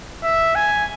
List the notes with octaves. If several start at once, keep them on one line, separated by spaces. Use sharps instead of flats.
E5
G#5